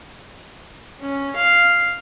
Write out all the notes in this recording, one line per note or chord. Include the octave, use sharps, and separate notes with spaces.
C#4
F5